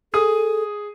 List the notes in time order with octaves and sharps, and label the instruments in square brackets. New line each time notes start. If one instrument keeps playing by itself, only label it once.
[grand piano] G#4 D#6 [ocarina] A4